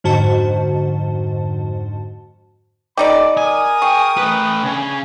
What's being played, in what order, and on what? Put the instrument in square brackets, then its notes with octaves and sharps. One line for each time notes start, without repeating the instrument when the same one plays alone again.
[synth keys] F2 G#2 D3 F#4 C5 A5
[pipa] G3 D#4 D5 [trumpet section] A4 B5 [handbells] D6
[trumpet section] A#4 D#6 [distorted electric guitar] G#5
[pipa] G#4 [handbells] G5 C#6
[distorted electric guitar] A3 B4
[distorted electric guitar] C#3 [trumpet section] D4 G#5